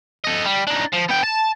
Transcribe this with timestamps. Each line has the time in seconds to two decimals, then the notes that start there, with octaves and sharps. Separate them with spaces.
0.24 A4 D#5
0.45 G3
0.67 D4 D#4
0.93 F3
1.10 B3 G5
1.24 A5